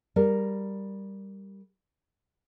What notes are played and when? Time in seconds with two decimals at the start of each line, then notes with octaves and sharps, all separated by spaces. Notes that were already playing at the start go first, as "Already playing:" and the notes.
0.16 G3 A#4